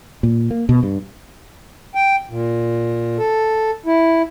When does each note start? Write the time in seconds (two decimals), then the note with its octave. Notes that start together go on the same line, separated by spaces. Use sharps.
0.23 A#2
0.51 A#3
0.69 B2
0.83 G2
1.95 G5
2.30 A#2
3.18 A4
3.86 E4